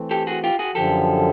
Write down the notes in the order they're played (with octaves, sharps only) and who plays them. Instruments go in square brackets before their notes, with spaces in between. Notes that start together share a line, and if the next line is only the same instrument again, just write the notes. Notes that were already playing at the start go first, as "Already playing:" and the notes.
Already playing: [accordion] E3 A3 C4
[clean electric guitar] G4 A4
F#4 G#4
F4 G4
F#4 G#4
[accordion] F#2 D3 F3 [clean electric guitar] G4 A4